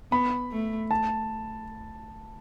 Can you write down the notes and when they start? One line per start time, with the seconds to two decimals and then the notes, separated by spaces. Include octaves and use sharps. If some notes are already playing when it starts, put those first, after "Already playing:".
0.12 B3 B5
0.52 A3
0.91 A5